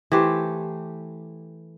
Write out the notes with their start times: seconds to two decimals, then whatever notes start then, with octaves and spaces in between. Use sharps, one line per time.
0.12 E3 A3 G4 C5